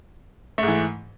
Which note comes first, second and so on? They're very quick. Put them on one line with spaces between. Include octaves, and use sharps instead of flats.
A3 G#2 E3